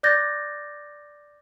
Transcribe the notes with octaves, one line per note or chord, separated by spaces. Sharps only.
D5 D6 F#6 G6 A6 A#6